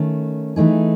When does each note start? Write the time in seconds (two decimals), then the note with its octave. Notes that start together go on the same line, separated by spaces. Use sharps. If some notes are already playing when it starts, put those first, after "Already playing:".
Already playing: D#3 A3 C#4
0.56 E3 A3 D#4 G#4